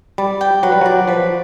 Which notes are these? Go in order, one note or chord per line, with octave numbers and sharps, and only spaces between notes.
G3 D5
G5
F#3 B4
G3
F#3 D5
F3 B4